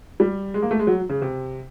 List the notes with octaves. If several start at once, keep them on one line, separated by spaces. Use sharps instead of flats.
G3
G#3
A#3
A3
G#3
F#3
C#3
C3